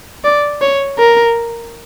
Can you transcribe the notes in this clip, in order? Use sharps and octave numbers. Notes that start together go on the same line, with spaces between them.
D5
C#5
A#4